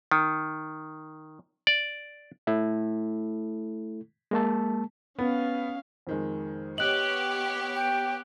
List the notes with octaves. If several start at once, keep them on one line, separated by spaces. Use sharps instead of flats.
D#3
D5
A3 E4 A4
G#3 A#3 A5
B3 C#4 F5
F2 D#3 G#3
B3 G4 C#5 D#5 F#6 F#7
G5